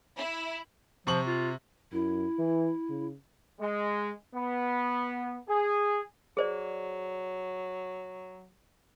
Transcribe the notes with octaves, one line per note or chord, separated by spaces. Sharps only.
E4
C3 F3 C#6 F#7
F4
F#2 E4
E3
C#3
G#3
B3
G#4
F#3 G#4 C5 D5